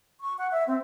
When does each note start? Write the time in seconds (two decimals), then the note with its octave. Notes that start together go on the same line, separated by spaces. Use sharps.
0.20 C#6
0.38 F#5
0.51 E5
0.67 C4